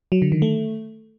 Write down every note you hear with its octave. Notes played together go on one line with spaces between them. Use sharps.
F#3
D3
D#3
A3